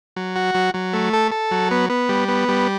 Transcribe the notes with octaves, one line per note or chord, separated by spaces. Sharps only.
F#3
F#4
F#3
F#3
A3
A4
A4
F#3
B3
B3
G3
B3
G3